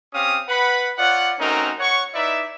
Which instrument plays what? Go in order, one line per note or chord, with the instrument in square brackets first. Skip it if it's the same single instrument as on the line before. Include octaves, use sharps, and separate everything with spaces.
[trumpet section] C4 C#4 G4 F5 D#6
B4 F#5 B5
F4 C#5 D5 F#5
A3 C4 C#4 D#4 F#4 A#4
C#5 F#5 C#6
D#4 E4 B4 D5 E5